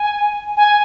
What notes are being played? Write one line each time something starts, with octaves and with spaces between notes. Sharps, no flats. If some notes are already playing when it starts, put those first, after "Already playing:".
Already playing: G#5
G#5